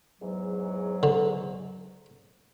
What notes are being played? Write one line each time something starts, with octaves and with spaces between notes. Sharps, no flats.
E2 G#2 F#3
D3